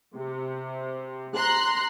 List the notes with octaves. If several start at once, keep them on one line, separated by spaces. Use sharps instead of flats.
C3
A#5 C6 F#6